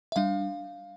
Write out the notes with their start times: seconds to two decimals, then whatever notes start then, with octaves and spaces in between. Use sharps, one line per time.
0.12 E5
0.16 G3 D4 F5